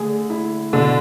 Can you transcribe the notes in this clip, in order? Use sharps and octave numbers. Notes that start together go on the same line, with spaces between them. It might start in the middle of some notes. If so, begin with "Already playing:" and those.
Already playing: D3 A3 G#4
E4
B2 D3